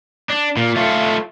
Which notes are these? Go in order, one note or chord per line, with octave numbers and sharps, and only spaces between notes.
D4
A#2
A3 F4